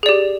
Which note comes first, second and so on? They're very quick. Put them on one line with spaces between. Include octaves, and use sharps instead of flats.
G#4 D5 G4